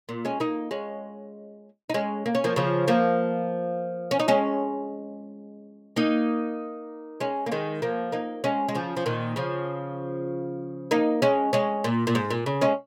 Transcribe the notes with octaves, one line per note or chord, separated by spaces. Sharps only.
A#2
G#3 C#4
A#3 D#4
G#3 C#4
D#4
G#3 C#4
A#3
C#4
F3 A#3
C#3 F3
F3 A#3
C#4
D#4
G#3 C#4
A#3 D#4
G#3 C#4
A#3
D#3 G#3
F3 A#3
A#3 D#4
G#3 C#4
G#3
C#3 F3
F3
A#2 D#3
C#3 F3
A#3 D#4
G#3 C#4
G#3 C#4
A#2
A#2
G#2
A#2
C#3
G#3 C#4